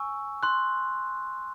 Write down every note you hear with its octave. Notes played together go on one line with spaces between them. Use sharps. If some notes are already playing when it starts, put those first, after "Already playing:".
Already playing: G#5 C#6 E6
C6 F#6